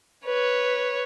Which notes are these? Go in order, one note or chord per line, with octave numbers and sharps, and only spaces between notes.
B4 C#5